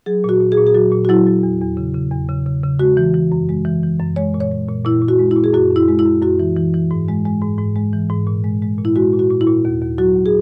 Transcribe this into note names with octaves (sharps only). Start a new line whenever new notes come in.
F#3 G#4
A#2 F#4
A#2
G#4
A#2
G#4
F#3 F#4
A#2
F#4
F#3 E4
F#3
E2
E2
C#3
C#3
E2
C#3
C#3
C#3
G#3 F#4
E3
E3
F#2
G#3
E3
E3
F#2
G#3 C#5
A#2
C#5
G#3
A#2
A#2 E4
A#2
F#4
G#3
E4
A#2
G#4
F#2 F#4
F#2 E4
G#3
E4
F#2
F#2 F#4
E3
E3
E3
G#2
G#3
G#3
G#2
G#2
G#3
E3
G#2
A#2
G#3
G#3
A#2
E4
G#3 F#4
A#2
F#4
A#2
E4
A#2
D#2
D#2
F#3 F#4
D#2
G#4